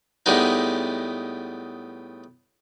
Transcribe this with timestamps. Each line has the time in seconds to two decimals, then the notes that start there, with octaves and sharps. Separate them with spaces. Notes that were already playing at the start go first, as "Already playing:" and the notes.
0.26 A2 G3 G#3 B3 D#4